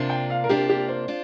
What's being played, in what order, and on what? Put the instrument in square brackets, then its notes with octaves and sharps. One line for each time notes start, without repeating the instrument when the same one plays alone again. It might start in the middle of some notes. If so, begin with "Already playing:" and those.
Already playing: [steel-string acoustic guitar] C3 A#3 D4 F4
[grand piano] G5
F5
A#4
[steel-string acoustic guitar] C3 A#3 D4 F4 [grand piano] G4
[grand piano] G4
C5
[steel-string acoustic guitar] D4 F4